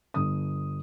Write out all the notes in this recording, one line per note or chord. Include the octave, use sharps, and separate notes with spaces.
G1 D#6